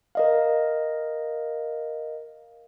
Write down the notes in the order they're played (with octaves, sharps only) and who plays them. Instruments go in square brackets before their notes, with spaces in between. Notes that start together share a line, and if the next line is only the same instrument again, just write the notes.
[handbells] A#4 D#5 F5